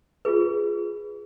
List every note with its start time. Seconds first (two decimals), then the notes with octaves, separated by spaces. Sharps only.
0.25 F4 G#4 B4